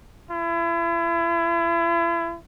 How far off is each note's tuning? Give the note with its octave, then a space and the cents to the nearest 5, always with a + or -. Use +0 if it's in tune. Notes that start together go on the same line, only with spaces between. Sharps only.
E4 +35